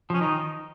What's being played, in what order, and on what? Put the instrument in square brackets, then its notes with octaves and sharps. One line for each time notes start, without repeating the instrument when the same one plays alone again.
[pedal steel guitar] F3 [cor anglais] C#4
[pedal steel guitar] D#3 [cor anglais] D#4